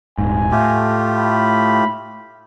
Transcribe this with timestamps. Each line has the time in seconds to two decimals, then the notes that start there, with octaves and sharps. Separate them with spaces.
0.18 D#1 G#2 G#5
0.52 A2 A3 F4 G4
1.18 B5